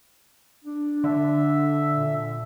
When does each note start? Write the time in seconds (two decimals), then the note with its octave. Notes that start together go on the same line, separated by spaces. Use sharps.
0.64 D4
1.04 D3 E5
1.90 A#2